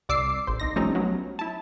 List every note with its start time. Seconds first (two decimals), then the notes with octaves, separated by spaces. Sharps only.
0.09 C2 D5 D6 E6 C7
0.47 A1 C5
0.60 C2 D#4 A#6
0.76 F3 G3 A3 C4 C#4 D#4
0.95 F#3 B3 C#4
1.39 E4 A5